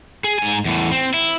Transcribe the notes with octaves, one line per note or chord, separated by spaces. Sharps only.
G#4
G#2 G#5
E2 A2
C4
E4